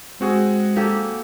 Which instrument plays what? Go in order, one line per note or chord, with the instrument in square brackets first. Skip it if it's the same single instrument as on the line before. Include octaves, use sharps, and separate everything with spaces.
[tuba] G#3 [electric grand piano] C4 F#4 G#4
[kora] A#3 G4 A4